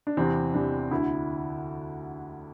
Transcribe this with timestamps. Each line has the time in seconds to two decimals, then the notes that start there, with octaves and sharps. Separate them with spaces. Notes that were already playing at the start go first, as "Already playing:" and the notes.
0.07 D4
0.17 E2 C3 E3 C4
0.54 E2 C3 E3 D4
0.91 D2 D3 E4